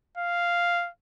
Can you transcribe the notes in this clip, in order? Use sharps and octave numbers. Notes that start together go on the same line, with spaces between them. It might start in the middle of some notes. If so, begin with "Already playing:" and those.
F5